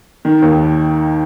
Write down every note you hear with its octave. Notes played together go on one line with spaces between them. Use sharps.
D#3
D#2